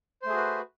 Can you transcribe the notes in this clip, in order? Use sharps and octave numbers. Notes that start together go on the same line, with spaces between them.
A3 F#4 G#4 B4 C5